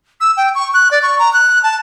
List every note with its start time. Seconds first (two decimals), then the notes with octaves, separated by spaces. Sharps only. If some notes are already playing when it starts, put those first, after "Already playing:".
0.21 E6
0.37 G5
0.55 C#6
0.74 F#6
0.91 D5
1.03 C#6
1.19 A#5
1.33 F#6
1.63 A5